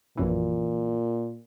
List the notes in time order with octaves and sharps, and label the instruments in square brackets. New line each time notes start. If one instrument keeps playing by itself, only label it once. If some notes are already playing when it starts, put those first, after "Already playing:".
[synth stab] A#1 F#2 E3 [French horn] A#2